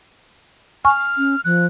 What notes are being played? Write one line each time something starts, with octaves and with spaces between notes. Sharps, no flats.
G#5 C#6 F6
C#4
F3 F#6